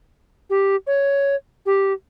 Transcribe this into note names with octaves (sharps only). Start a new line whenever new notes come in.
G4
C#5
G4